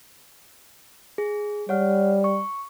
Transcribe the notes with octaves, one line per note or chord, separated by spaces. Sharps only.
G#4
G3 C#5 F#5 F6
C#6